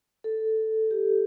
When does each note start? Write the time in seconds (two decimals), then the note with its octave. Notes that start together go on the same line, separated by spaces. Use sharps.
0.24 A4
0.91 G4